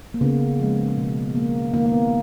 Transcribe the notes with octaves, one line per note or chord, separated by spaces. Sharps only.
A#3
C#3 B3
F3 G#3
B2
A#3
D#3 A#3
A#3
B3